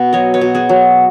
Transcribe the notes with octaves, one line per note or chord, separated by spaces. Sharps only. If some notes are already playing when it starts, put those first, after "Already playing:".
Already playing: B2 B3
F#3 C#5 D#5
B4 C#5
B2
F#4 G#4
F#3